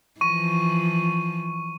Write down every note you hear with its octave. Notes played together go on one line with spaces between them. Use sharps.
E3 F3 C#6 D#7